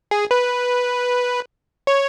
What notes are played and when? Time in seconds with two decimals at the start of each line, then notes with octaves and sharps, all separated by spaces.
0.11 G#4
0.31 B4
1.87 C#5